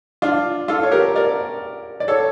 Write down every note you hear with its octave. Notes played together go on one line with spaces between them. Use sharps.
D4 F4
F4 A4
C#5
G4 A#4
A#4 D5
D5
A4 C#5